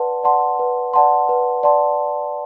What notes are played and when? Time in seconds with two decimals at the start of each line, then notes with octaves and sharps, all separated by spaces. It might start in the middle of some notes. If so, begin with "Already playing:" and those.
Already playing: B4 D5 F#5 A5 C6
0.23 D5 F#5 A5 C6
0.59 B4
0.93 D5 F#5 A5 C6
1.29 B4
1.63 D5 F#5 A5 C6